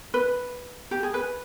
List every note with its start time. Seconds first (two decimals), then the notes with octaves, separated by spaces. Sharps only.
0.14 B4
0.91 G4
1.03 G#4
1.14 B4